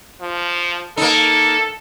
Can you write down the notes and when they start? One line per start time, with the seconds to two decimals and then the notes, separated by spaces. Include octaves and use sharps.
0.21 F3
0.97 A#3 D#4 A4